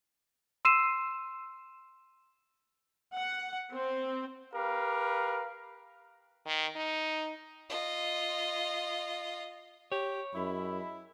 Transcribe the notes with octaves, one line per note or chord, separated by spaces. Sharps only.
C6 E6 C7 D#7 E7
F#5
C4
G4 A#4 B4 F5
D#3
D#4
F4 D#5
G4 C#5
F#2 G#3 E4 E5 B5